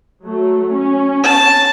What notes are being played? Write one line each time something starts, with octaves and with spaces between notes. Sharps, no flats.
F#3 A3
C#4
A5